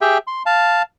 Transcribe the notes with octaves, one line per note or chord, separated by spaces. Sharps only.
G4 G#4 E5 G5
C6
F5 A5